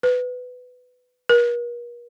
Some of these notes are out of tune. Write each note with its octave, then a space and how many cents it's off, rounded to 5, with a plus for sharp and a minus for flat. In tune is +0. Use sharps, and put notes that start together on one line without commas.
B4 +15
A#4 +45